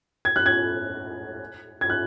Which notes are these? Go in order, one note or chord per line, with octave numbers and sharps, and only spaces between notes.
G#6
F#6
G#6
G#6
F#6